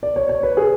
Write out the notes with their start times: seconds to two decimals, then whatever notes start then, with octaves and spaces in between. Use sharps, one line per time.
0.03 D5
0.16 C#5
0.29 C#5
0.43 B4
0.57 G#4